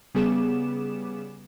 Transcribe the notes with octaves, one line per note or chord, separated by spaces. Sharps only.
C#3 G3 B3 G#4 D6 E7